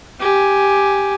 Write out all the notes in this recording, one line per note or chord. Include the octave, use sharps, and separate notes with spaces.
G4 G#5